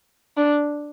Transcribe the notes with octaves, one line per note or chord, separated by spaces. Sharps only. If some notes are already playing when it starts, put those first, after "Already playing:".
D4